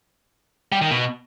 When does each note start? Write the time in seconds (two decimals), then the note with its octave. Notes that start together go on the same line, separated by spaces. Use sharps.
0.72 G3
0.82 D#3
0.91 B2